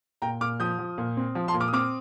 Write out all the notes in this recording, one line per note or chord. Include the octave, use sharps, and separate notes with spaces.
A#2 G5 A#5
A#2 D6 F6
F3 D#6 G6
F3
A#2
C4
F3
A5 C6
A#2
D6 F6
D#6
C4 D6 F6